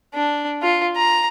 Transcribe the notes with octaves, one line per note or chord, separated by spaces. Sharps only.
D4
F4
A#5